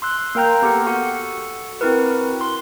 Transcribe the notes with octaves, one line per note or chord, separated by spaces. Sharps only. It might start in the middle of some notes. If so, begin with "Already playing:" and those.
C6 E6 F#6
A#3 A#4 G5 A#5 G6
B3 G4 A4 F6 C#7
F#4 A4 F#5
C4 E4 F#4 A#4 B4
C6